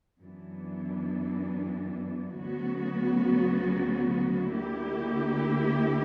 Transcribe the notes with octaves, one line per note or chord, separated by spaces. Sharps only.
F#2 E3 B3 D4
D2 C#3 F#3 B3 F#4
D2 D3 A#3 E4 G4